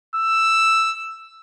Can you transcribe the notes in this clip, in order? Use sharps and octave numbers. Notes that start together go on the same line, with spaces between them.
E6